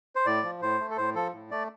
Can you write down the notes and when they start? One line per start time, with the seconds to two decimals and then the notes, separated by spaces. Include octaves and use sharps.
0.16 C5
0.26 A2 D5
0.43 F3
0.62 A2 C5
0.80 A3
0.91 A4
0.97 A2 C5
1.15 F3 A4
1.33 A2
1.51 A3 D5